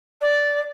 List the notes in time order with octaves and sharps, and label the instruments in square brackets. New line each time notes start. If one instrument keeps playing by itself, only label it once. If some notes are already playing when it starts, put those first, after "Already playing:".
[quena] D5